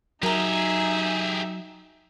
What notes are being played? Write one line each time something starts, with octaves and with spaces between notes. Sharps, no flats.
F#3 D#4 G4 G#4 A#4 E5 A#5